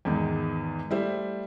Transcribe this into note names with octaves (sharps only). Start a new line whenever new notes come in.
E2 G#2 D#3
G3 A3 E4 C5